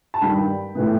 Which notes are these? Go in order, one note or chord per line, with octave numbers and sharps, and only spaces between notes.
A5
G2 D#3 G3 G5 B5
A2 E3 B3